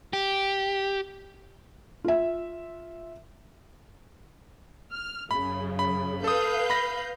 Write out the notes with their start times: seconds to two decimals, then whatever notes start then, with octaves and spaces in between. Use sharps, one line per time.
0.13 G4
2.04 F4 E5
4.92 F6
5.31 F#2 C#3 B5
5.79 B5
6.24 A4 B4 F5 D#6 G6
6.70 B5 A#6